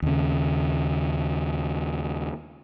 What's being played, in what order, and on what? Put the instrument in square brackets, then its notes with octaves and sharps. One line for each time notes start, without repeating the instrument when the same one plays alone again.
[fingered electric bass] D#2 C#3